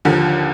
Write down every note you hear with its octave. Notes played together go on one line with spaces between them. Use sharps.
D#2 D3 F3